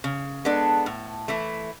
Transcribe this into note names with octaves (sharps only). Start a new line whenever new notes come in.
C#3
G#3 B3 D4 A4
A2
E3 A3 E4